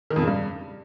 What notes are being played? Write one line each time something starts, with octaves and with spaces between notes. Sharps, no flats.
D#3
F2
C#3
G2